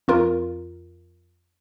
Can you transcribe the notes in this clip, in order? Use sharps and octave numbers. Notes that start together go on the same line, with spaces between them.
F2 F4 A#4